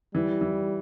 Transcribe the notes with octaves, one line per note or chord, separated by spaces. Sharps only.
E3 G3
E3